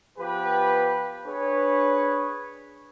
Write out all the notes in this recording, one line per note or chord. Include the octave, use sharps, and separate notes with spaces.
F3 B3 G4 B4
D4 G#4 B4 C#5